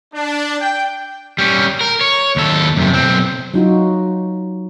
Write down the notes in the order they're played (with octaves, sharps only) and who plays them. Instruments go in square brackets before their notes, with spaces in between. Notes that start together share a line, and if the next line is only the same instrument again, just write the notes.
[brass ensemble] D4
G5
[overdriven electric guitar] G3 C#4
A#4
C#5
D#2 A4
F#2 C3
B1 C4
[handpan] F#3 D#4 F4 F#4